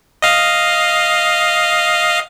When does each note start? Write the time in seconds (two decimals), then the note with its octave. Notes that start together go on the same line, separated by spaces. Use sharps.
0.22 D#5 F5